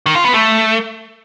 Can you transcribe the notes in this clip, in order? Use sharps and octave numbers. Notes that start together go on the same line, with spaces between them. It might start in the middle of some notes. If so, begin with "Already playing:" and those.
D#3
F4
B3
A3